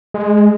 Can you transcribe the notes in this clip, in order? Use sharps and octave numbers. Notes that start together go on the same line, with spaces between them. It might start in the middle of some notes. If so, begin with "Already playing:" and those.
G#3